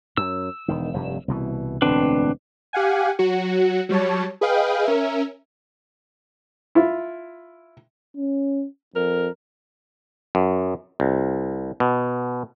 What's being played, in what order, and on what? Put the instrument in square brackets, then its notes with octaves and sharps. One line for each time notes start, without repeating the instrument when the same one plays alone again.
[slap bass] F#2 [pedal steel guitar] E6
[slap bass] E1 D#3
F1 G2
C2 B2 E3
[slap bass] E1 D2 A2 [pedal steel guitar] C4 D4 B4
[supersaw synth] G4 F5 F#5 G#5
F#3 F#4 C#7
F#3 G3 C#5 A5
G#4 B4 D#5 F5 G5
C#4 A#4 E5
[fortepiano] E4 F4
[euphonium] C#4
[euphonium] F2 [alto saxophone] A#4
[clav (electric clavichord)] F#2
C2
B2